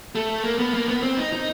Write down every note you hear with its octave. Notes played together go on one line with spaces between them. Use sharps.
A3
A#3
B3
A#3
B3
C4
D#4
D#4